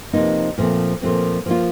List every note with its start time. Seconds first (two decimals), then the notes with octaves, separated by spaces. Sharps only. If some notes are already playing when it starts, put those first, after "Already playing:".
0.13 C3 F3 A#3 D#4
0.58 A#2 F3 A3 C4
1.02 A#2 F3 A3 C4
1.46 F3 A#3 F4